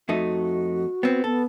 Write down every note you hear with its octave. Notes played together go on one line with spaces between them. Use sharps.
F2 A3 D#4 F#4
B3 C4
B3 A4